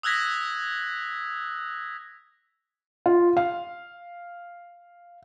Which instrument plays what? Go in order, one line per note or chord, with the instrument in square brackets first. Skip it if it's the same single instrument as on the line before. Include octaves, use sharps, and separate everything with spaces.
[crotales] D#6 E6 F#6 G#6 A#6 B6
[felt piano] F4
F5